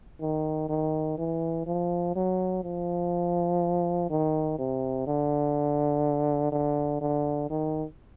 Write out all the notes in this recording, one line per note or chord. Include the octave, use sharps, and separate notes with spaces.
D#3
D#3
E3
F3
F#3
F3
D#3
C3
D3
D3
D3
D#3